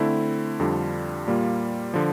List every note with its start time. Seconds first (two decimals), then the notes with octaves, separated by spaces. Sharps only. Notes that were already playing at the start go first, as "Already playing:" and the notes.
Already playing: D3 A3 C4 E4
0.60 F2 D3 G3 D4 F4
1.27 A#2 G3 A#3 F4
1.94 D3 F3